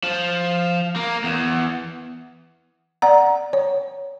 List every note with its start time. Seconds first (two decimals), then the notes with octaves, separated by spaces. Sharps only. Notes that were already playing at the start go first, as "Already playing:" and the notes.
0.03 F3
0.96 A#3
1.24 E2
3.02 D5 F#5 A#5
3.53 C#5